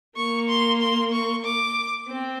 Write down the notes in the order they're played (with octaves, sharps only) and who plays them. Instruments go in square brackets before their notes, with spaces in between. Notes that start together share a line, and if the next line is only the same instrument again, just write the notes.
[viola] A#3 [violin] C#6
[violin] C6
C6
C#6
D6
[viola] C4